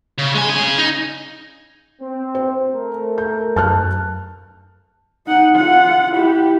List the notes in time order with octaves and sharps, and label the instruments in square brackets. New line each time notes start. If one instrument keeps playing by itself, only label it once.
[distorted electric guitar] C#3
G#3 G#5
C#3 G#5
D#4
[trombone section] C4
[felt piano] C5
[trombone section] A3 A#4
[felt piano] G6
[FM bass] F#2 [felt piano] A5 F6 F#6
[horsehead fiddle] D#4 F#5
F4 F#5
E4 G4